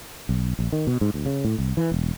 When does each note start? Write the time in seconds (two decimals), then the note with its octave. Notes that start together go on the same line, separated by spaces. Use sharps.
0.29 B1
0.59 A#1
0.72 D#3
0.87 B2
1.01 G#2
1.14 D2
1.26 C#3
1.45 A2
1.59 C2
1.77 E3
1.92 E1